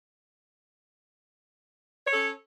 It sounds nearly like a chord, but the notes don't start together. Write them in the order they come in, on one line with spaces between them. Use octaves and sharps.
C#5 A4 C#4